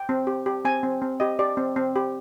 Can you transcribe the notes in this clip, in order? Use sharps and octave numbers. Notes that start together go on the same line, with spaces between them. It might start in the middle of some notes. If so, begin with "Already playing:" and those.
Already playing: G5
C4
G4
G4
C4 G#5
C4
C4
G4 D#5
G4 D5
C4
C4
G4